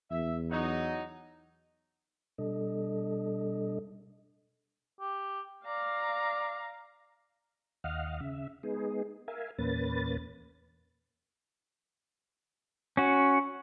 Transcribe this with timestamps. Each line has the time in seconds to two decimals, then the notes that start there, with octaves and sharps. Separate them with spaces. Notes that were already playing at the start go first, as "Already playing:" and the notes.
0.11 E2 E5
0.51 F#3 D#4
2.38 B2 G3 D4 A4 D#5
5.00 G4
5.66 D5 F5 A#5
7.84 D#2 D#5 F5 F#5 F6
8.21 C#3 E5
8.63 G#3 B3 D#4 G#4
9.28 A#4 E5 F5 G#5
9.58 E2 A#2 A#3 C#4 B4 A6
12.97 C#4 F#4